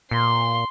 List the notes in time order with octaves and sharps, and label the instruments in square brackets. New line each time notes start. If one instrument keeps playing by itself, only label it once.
[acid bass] A#2 [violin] C6